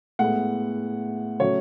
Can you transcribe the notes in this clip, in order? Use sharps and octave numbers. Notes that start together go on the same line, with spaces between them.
A2 G#3 B3 F#5
C#3 F#3 A3 C#5